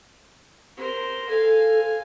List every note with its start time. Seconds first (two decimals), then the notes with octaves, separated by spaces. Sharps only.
0.77 A#4 C5
1.29 A4 F5 G#5